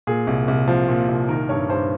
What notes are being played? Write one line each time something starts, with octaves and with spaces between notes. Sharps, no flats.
A#2 G#4
C2
C2
F3
A#2
C2
D#3 A#4
G2 C#5
G2 C5